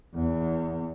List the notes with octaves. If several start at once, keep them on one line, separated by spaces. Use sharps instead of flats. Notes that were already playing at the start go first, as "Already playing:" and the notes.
E2